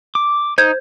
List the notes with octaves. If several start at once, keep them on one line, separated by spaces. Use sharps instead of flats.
D6
D#4 C5 G6 G#6